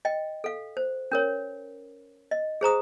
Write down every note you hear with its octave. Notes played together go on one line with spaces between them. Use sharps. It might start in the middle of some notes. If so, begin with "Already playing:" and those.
D#5 G5
A4 F5
C5
C#4 A#4 C#5
D#5
G#4 C5 A#5 D#6